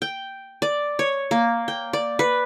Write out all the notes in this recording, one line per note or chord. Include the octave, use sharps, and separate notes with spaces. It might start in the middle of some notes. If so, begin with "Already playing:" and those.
G5
D5
C#5
A#3
G5
D5
B4